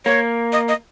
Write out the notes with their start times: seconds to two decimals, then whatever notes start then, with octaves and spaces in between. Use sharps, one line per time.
0.05 A#3 C#5
0.53 D#5
0.68 D#5